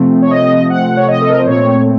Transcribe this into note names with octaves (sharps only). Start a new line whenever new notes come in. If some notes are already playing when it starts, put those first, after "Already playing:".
Already playing: C3 F3 A3 C4
C#5
D#5
F#5
C#5
D#5
A4
A#4
C5
A#2 A3 C4 C#5